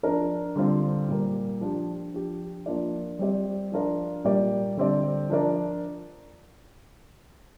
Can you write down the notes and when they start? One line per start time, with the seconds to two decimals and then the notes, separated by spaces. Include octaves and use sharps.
0.03 F3 D4 A#4 D5
0.56 D3 G3 C4 F4
1.09 A#2 G3 A#3
1.61 F3 D4 G4
2.14 F3 D4 G4
2.66 F3 A#3 D4 F4 D5
3.19 G3 C4 G4 D5
3.72 F3 D4 F4 A#4 D5
4.24 A#2 G3 A#3 G4 D5
4.77 D3 G3 C4 G4 D5
5.30 F3 D4 A#4 D5